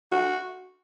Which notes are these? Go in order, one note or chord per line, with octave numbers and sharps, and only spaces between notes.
F#4